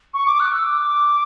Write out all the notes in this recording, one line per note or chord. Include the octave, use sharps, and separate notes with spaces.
C#6
D6
F#6
E6
D6